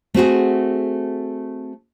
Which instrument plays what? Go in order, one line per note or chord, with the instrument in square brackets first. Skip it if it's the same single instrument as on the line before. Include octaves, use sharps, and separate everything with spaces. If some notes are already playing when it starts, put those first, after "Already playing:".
[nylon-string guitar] A3 C4 F#4 G#4